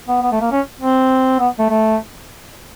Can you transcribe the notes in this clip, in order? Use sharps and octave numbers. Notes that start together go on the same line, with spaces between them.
B3
B3
A3
A#3
C#4
C4
B3
A3
A3